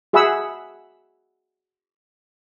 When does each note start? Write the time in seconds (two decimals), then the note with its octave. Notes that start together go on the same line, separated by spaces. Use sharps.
0.13 F#4 G#4 E5 F#5 B5 E6